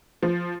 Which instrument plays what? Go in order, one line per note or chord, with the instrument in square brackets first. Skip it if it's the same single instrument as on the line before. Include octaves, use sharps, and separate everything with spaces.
[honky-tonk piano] F3